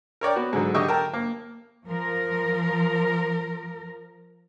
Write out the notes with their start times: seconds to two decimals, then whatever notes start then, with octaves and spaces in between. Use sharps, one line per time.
0.21 A#4 C#5 D5 G5
0.36 B3 F#4
0.53 G#2 D3 F#3
0.74 D3 G4 D#5 G5 C#6 E6
0.88 A#4 G5 A5
1.13 A#3
1.86 F3 A#4